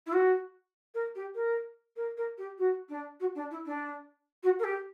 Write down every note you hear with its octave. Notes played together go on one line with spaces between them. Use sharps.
E4
F#4
A#4
G4
A#4
A#4
A#4
G4
F#4
D4
F#4
D4
E4
D4
F#4
A#4
G4